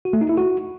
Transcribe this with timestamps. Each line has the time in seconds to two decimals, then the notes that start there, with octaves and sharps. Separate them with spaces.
0.05 F#4
0.13 A3
0.21 D#4
0.29 E4
0.37 F#4